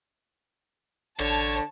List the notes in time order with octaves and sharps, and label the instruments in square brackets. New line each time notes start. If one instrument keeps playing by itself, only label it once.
[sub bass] A1 [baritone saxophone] D3 [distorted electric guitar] C#5 [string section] A5